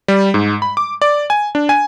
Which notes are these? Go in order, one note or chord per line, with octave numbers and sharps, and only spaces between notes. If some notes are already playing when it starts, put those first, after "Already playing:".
G3
G#2
B5
D6
D5
G#5
D4
G#5